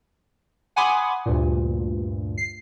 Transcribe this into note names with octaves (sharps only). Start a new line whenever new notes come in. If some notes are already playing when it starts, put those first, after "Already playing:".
F#5 G#5 B5 C6 D6 D#6
D2 G2 A#2
C7